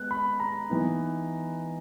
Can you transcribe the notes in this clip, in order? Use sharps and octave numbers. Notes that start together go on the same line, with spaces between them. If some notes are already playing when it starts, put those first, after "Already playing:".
Already playing: G#3 B3 F#6
B5
A#5
E3 B3 D#4